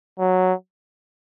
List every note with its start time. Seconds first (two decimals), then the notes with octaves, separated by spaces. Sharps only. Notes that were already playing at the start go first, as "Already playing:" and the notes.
0.19 F#3